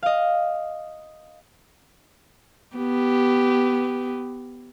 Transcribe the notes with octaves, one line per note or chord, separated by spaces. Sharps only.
D#5 F5
B3 G4